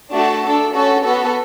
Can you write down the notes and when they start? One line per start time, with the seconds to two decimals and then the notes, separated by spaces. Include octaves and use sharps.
0.11 A3 D4 F#4 A4 A5
0.42 D4 A4
0.73 C#4 F#4 A4
1.03 B3 F#4 A4